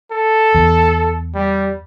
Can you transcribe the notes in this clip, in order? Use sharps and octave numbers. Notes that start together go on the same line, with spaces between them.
A4
E2
G3